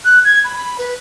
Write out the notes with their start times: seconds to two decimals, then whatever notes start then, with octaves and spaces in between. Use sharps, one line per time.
0.04 F#6
0.24 G#6
0.44 B5
0.56 B5
0.78 B4